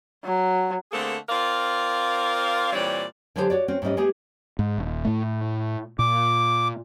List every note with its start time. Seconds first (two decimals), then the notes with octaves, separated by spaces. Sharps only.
0.25 F#3
0.92 D3 A3 A#3 C4 G#4 A4
1.29 C4 F4 A#4 D5 F5
2.73 A#2 E3 G3 C4 C#5 D5
3.36 D3 F#3 G#3 G4 G#4 C5
3.50 F#4 C#5 D5
3.68 C4 C#4 F#4
3.82 G#2 G3 C#4 D#5
3.97 G#3 B3 G4 G#4
4.59 G#2
4.78 D#1
5.05 A2 A3
5.99 A#2 D6